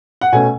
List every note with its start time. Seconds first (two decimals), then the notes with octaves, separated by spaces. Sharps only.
0.21 F#5
0.32 B2 A3 C#4 G#5